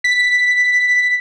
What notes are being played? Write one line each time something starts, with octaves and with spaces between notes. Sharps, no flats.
B6